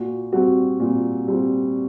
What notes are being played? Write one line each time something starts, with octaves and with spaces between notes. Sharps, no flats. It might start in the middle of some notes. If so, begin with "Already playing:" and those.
Already playing: A#2 F#4
G3 C4 F#4
A#2
G3 C4